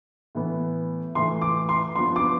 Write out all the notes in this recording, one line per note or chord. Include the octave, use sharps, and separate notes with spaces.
A2 E3 B3
A2 E3 A3 C6
D6
C6
G2 F3 B3 C6
D6